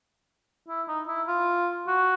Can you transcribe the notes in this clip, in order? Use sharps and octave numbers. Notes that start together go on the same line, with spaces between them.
E4
D#4
E4
F4
F#4